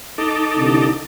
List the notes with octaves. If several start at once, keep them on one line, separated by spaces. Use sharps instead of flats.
D#4 A4 D6
C2 D3